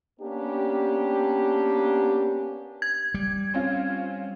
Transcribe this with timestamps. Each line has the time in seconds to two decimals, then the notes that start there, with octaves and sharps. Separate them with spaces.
0.20 A#3 B3 C#4 D4 G4
2.82 G#6
3.14 G3
3.54 C4 C#4 F4